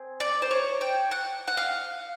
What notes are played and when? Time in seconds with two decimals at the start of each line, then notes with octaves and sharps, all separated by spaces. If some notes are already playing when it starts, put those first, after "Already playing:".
Already playing: C4 G#4
0.20 D5
0.42 C5
0.51 C#5
0.81 G5
1.11 F#5
1.47 F#5
1.57 F5